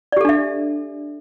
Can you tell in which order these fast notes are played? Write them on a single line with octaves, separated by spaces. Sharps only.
D5 G4 A4 D4 E5